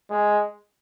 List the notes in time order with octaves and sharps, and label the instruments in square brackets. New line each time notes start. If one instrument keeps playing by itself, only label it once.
[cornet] G#3